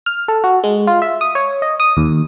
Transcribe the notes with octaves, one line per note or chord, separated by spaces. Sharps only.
F6
A4
F#4
G#3
F4
E5
D#6
C#5
D#5
D#6
D#2